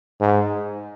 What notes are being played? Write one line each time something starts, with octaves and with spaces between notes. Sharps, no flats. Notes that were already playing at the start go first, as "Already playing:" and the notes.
G#2